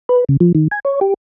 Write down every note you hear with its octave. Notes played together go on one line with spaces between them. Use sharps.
B4
C#3
F3
D#3
G#5
C#5
G4